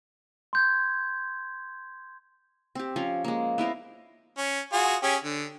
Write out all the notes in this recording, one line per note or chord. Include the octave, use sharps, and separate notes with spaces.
C6 G6 G#6
C4 G4
F3 C#4
G#3 A#3
B3 E4 A#4 C5
C#4
F4 F#4 G#4
C#4 G4 G#4
D3